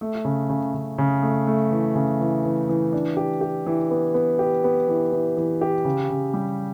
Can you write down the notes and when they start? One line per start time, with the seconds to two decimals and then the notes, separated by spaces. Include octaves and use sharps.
0.01 A3
0.25 C#3
0.50 C#3
0.74 C#3
0.98 C#3
1.23 A3
1.47 A3
1.72 E3
1.95 C#3
2.21 E3
2.45 E3
2.69 E3
2.92 D4
3.17 G4
3.41 G4
3.66 E3
3.91 B3
4.14 B3
4.39 G4
4.64 B3
4.88 E3
5.12 E3
5.37 E3
5.61 G4
5.85 C#3
6.10 C#3
6.34 G3